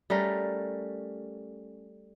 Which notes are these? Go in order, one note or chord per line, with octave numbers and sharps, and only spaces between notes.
G3 A3 C#4 A#4